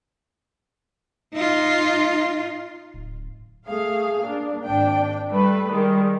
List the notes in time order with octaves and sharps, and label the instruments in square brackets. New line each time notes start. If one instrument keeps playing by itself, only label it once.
[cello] D#4 F4
[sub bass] D1
[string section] A3 G#4 F5
A#3 D4
G#1 D4 G5
G3 A3 B4
D#3 G3 G#3